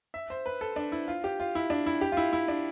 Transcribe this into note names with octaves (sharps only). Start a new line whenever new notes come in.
E5
C5
B4
A4
D4
E4
F4
G4
F4
E4
D4
E4
G4
F4
E4
E4
D4